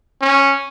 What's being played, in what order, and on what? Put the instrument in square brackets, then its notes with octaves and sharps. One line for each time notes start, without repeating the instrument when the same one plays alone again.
[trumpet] C#4